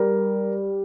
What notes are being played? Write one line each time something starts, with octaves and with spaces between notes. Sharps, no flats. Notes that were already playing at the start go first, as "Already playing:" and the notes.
Already playing: G3 A#4